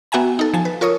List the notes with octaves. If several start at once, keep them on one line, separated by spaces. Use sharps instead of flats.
B3 F#4 E5 G5 G#5 A#5
D#4 A4
F3 G#5 A5
B4
F4 A#4 C#5 C#6 D#6